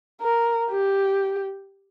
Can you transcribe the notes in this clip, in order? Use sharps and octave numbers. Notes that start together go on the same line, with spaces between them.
A#4
G4